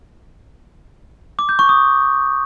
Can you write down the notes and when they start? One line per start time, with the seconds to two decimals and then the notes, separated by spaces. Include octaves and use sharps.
1.39 D6
1.49 G6
1.59 C#6
1.69 D#6